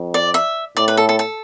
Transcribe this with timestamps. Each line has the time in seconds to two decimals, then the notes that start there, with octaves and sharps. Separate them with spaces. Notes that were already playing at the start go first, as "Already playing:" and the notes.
Already playing: F2
0.14 D5
0.34 E5
0.77 A2 D5
0.88 B4
0.97 A4
1.09 A4
1.19 A4